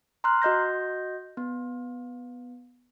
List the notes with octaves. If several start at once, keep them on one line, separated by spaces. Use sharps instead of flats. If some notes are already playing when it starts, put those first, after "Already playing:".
A#5 C6 F6 F#6
F#4 D#5 G6 A#6
B3